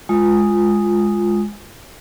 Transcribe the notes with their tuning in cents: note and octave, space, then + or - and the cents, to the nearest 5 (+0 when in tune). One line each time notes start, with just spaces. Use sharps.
G#3 +0 F4 +0 D#6 +0